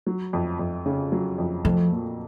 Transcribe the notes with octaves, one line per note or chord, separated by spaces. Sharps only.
F#3
F2
F2
C#3
F#3
F2
F3 A3
A#2